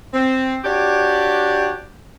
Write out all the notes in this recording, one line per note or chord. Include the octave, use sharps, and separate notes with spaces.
C4
D4 F#4 G4 C#5 D5